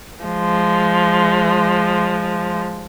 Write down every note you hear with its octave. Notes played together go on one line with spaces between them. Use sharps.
F3 G#3